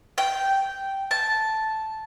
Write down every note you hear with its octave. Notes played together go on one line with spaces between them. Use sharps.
G5
A5